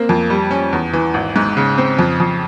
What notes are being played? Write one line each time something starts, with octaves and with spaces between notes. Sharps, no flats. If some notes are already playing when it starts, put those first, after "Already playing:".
Already playing: A#3 C4
F2
G3
C#4
E2
E3
G#1
G#2
C#3
C4
F2
F2